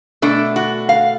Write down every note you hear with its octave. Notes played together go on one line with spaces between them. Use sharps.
B2 A3 D4
F#4
F5